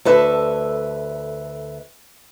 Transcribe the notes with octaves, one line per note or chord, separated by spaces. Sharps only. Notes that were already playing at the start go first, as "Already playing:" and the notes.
D2 A4 B4 E5